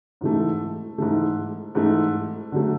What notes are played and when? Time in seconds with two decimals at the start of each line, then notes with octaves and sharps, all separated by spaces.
0.21 G#2 E3 A3
0.98 G#2 E3 A3
1.75 G#2 E3 A3
2.52 D3 F#3 A3